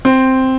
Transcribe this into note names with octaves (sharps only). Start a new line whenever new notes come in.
C4